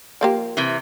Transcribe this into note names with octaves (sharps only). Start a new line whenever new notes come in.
F3 A#3 G4
C3 E3